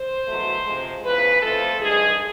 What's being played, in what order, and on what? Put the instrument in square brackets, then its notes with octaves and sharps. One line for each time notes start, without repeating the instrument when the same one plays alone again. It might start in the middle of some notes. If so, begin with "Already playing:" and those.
Already playing: [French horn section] C5
E2 B2 F#3 A3
C3 F3 G#3
E2 C#3 F3 B4
F2 C#3 F3 A3 A4
G2 D#3 G#3 G#4